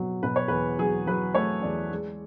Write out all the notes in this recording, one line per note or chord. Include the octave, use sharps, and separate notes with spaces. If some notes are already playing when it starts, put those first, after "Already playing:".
Already playing: B2 F#3
B2 B4
C#5
E2 B4
F#3 G#4
F#3 B4
A3 C#5
E2 D5
G#3